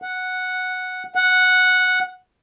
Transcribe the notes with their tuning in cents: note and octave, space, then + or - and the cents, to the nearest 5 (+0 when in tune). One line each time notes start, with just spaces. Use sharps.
F#5 -5
F#5 -5